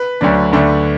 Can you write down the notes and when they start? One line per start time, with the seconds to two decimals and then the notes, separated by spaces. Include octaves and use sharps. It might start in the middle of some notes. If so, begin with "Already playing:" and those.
Already playing: B4
0.21 D2 D3 F#3 D4
0.53 D2 D3 A3 D4